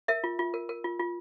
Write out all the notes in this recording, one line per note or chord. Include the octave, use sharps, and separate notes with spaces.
A#4 E5
F4
F4
A#4
A#4
F4
F4